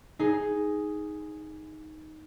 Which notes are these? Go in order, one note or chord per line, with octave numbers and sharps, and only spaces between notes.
D#4 G#4